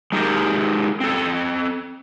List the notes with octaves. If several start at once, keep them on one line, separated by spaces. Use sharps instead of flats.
G#3 D#4 G4 A#4
C4 A4